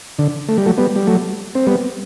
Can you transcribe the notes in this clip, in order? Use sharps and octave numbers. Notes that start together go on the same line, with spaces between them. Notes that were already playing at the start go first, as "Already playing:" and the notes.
D3
A3
G3
F#3 A3
G3 B3
G3
F#3 A3
C4
G3 B3